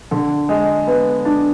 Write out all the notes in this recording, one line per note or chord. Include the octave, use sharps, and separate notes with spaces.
D3
G#3
B3
D4